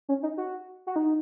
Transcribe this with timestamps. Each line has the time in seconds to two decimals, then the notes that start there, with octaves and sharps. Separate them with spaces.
0.09 C#4
0.23 D#4
0.37 F#4
0.87 F#4
0.96 D#4